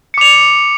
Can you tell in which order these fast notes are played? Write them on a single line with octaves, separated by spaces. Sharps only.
C#7 D6 F7